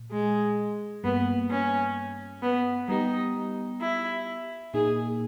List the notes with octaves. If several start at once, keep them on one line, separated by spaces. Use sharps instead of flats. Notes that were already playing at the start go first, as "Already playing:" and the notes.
Already playing: A#2
G#3
G2 G3 A#3 B3
C#4
B3
G3 B3 D#4 G4
E4
A#2 A#3 D#4 G#4